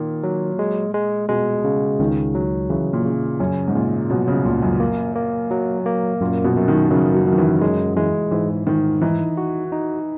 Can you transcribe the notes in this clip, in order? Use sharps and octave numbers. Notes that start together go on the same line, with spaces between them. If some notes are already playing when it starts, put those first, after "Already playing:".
Already playing: A#2 D#3
F#3
G#3
G#3
B2 G#3
C#3
C#2 D#3
F#3
C#3 E3
A#2
C#3
F#2 C#4
G#2
A#2 C#3
B2 F#3
C#3
C#2 A#2
F#2
A#3
A#3
F#3
A#3
F#2 A#2
B2
F#2
D#3
F#2 C#3
F#3
F#2
D#3
E3
F#3 G#3
E3 G#3
G#2 E3
G#2 D#3
E3 D#4
F#4
D#4